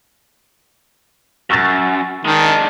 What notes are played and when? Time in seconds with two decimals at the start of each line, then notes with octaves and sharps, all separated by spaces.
1.50 F#2 C#6 E6 A6
2.25 D#3 G#3 D4